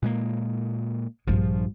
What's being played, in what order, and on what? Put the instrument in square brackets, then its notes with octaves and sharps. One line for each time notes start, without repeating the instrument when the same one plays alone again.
[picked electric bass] A#2 G#3 A#3
[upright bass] A#1 G2 [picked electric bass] F3